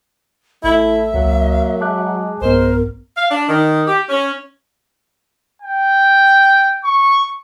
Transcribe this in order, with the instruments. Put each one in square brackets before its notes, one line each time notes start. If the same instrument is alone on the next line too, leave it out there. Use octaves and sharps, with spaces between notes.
[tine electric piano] A1 [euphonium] A3 [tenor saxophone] E4 [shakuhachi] E5
[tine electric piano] C#2 [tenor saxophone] F#3 [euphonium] A#3
[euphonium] G#3 [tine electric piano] A5 D6 F#6
[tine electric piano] B1 G2 B3 [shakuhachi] A#4 [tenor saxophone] C5
[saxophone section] F5
D4
D#3
G4
C#4
[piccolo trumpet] G5
C#6